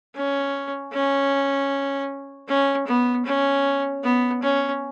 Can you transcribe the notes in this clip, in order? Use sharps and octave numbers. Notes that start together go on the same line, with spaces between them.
C#4
C#4
C#4
B3
C#4
B3
C#4